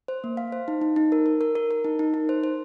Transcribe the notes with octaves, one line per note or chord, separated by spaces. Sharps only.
C5
A#3
F5
C5
D#4
D#4
D#4
A#4
A#4
A#4
A#4
A#4
D#4
D#4
D#4
C5
C5